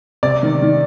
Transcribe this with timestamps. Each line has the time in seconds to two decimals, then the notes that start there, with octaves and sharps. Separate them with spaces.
0.23 C3 D5
0.43 D#3
0.62 D#3